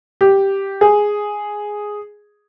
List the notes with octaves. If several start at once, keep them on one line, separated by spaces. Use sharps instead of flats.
G4
G#4